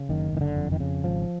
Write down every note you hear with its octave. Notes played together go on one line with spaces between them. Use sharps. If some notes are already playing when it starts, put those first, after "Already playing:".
Already playing: C#3
F#1 D#3
F#1 D#3
D3
F2
D#3
C#3
G#1 F3